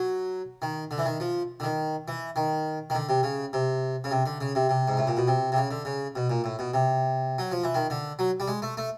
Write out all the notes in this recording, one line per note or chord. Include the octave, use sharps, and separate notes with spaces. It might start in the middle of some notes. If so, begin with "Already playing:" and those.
Already playing: F#3
D#3
D3
E3
D#3
F3
D3
D#3
E3
D#3
D#3
D3
C3
C#3
C3
C#3
C3
D3
C#3
C3
C3
G#2
A2
A#2
B2
C3
C3
C#3
D3
C#3
B2
A#2
A2
B2
C3
F#3
F3
E3
D#3
D3
F#3
G3
G#3
A3
A3